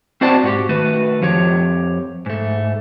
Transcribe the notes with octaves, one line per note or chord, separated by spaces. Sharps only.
C4 F#4 C5 D5 A5
G#2 F#4 G4
D#3 A3 F#4 B4
F2 F3 G4 C#5
G#2 A3